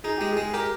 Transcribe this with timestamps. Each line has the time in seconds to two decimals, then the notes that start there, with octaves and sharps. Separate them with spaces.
0.04 D#4 G#4
0.17 G#3 G4
0.32 G#4
0.37 G#3
0.53 G4 A#4